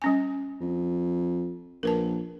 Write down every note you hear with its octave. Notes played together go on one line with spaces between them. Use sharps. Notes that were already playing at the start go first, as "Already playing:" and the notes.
G3 C#4 G#5
F2
A#1 A#4 B4 A5